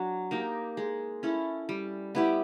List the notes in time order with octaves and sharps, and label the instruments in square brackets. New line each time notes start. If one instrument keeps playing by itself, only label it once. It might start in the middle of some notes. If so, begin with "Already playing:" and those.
Already playing: [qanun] F#3 D4
A#3 D#4 G4
G#3
C#4 E4 A4
G3
B3 E4 G4